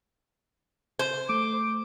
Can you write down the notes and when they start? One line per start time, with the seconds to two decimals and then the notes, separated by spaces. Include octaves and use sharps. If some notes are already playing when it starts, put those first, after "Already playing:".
0.99 C5
1.29 A3 D6